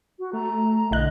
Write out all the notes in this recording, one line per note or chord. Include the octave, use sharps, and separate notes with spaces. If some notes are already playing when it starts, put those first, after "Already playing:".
F#4
A3 A#5
B1 D3 E4 D#5 F#6